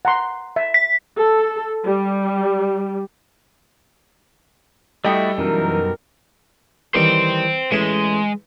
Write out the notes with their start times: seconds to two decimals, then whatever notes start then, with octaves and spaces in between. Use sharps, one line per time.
0.05 F#5 A#5 C6
0.56 E5
0.74 B6
1.17 A4
1.84 G3
5.04 G3 A3 E4 F#4 A4 D#5 G5
5.38 F#2 B2 E3 D#4 A#4
6.94 D#3 E3 G3 C5 G5
7.72 A1 G#3 E5 D#6